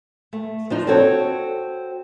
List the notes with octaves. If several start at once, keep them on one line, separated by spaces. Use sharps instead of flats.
A3
F3 D4 D#4
C4 F#4 A4 C#5